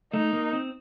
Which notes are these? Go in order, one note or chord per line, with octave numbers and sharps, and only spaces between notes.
A3 D#4
A#3
C4